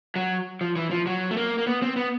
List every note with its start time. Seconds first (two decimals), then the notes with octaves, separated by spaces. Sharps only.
0.16 F#3
0.61 F3
0.76 E3
0.91 F3
1.06 F#3
1.31 A3
1.37 A#3
1.58 A#3
1.67 B3
1.82 C4
1.96 B3